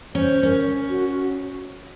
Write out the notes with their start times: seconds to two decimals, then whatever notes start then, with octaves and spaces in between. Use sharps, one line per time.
0.15 C#4 C5
0.43 C#4 A#4
0.89 F#4
1.09 F#4